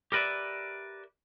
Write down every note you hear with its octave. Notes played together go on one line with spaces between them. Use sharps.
G4 A#4 B4 D5 E5